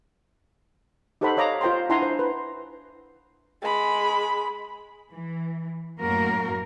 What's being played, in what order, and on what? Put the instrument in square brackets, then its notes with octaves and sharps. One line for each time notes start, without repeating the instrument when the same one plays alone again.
[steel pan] D#4 G4 A4 C5 F#5 B5
C#5 D#5 F5 A#5 D6
F4 C5 G5 A#5 C6
D4 E4 F#5 G#5 A#5 C6
C5
B4
[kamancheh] G#3 B5
[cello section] E3
F#2 A2 A#3 F#4 A#4